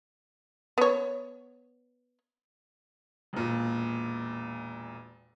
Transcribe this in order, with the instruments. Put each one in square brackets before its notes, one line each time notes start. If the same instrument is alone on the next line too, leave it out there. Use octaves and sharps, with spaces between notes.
[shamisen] B3 C#5
[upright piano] E1 A#2